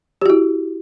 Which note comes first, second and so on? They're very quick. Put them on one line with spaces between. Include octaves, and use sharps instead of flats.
G4 F#4 E4